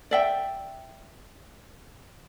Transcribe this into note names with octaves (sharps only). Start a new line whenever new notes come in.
D5 E5 G5